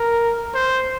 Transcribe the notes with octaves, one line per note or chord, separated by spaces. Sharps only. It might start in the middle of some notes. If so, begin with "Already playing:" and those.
Already playing: A#4
C5